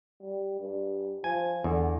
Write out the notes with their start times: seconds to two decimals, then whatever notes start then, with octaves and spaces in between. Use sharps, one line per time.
0.22 G3
0.60 G2
1.24 F3 G#5
1.64 E2 D3